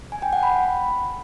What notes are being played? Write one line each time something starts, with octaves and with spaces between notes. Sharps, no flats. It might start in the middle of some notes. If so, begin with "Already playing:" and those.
G#5
G5
F#5
B5